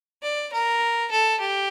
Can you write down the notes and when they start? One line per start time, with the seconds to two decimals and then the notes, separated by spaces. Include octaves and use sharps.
0.23 D5
0.53 A#4
1.11 A4
1.40 G4